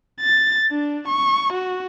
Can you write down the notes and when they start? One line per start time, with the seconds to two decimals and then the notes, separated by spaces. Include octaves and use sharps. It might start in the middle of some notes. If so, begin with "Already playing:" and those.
0.21 A6
0.72 D4
1.08 C#6
1.53 F#4